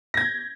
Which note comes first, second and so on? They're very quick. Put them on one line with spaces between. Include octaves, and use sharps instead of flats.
A#6 G#6 G6